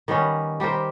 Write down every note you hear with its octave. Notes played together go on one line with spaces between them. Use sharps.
D#3 G3 B3 C#4
G3 G4 A#4 C5